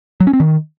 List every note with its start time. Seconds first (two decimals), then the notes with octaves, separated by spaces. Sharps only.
0.20 F#3
0.27 C#4
0.33 C4
0.40 D#3